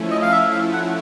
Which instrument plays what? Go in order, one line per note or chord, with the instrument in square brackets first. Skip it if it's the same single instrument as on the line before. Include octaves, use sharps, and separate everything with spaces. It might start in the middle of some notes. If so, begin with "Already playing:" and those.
Already playing: [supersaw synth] F3 A3 C#4 E4
[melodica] D#5
F5
E5
F5
F#5